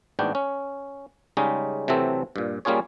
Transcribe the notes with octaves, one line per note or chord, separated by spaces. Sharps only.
A1 G#2 B3 D4 F#4 G5
C#4
C#3 G3 G#3 C#4 D#4
C3 E3 F#3 A3 C4 A4
G2 A#2
G3 A#3 C#4 F4 G#4 C#5